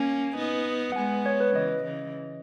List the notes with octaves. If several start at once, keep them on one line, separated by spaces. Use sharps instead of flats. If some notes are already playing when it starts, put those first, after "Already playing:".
Already playing: A#3 C#4 G#5
B3 D#4
F#5
G#3 B3 G#5
C#5
B4
C#3 E3 D#5
C#3 E3